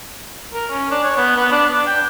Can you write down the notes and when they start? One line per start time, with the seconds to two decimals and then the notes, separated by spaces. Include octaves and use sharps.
0.54 A#4
0.70 C#4
0.91 D4
1.03 C#5
1.17 B3
1.37 B3
1.52 D4
1.70 D4
1.87 G5